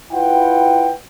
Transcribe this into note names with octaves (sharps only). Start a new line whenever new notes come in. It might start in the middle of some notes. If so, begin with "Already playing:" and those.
E4 F4 B4 F#5 G5